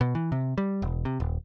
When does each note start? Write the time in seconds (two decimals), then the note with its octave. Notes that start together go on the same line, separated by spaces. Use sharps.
0.01 B2
0.15 E3
0.32 C3
0.58 G3
0.82 E1
1.05 C3
1.20 D#1